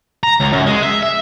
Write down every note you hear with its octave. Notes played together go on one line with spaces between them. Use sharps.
A#5
C#2
F#2
G#3
E5
E5